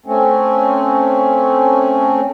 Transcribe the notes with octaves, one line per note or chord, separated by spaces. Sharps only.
A3 C4 C#4